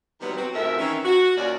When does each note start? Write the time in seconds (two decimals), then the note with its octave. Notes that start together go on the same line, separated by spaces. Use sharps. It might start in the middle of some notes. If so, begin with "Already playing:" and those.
0.21 C3 D#3 E3 F#3 G3 B3
0.37 C4 F#4
0.53 F2 G#2 B2 A3 A#4 E5
0.79 D#3 E3 C#4
1.04 F#4
1.37 D#2 A#2 C#4 D#4 F#4 D5